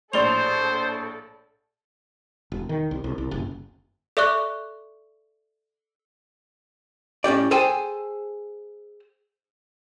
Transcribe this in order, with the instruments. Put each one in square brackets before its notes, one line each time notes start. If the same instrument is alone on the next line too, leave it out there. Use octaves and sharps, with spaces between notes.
[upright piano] A#1 A2 [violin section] A4 [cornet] C5 [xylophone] D5 C6 F7
[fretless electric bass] E1
D#3
C2
C2
C2
F#1
[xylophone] A4 D5 E5 C#6 D6 F#6
[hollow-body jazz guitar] A2 C#4 G4 D5
G#4 A4 C5 G5 G#5